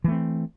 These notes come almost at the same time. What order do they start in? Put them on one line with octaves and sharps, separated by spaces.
E3 A3 C4